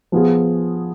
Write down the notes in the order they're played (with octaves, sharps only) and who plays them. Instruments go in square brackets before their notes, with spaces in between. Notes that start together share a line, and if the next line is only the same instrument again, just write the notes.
[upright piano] F3 B3 F4 G#4